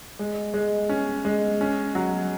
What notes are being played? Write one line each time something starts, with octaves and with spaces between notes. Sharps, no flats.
G#3
G#3
C#4
G#3
C#4
F#3